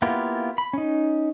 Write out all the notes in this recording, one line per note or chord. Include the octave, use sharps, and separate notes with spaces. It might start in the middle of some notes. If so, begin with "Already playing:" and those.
A#3 B3 E4 F4 G4
B5
C#4 D#4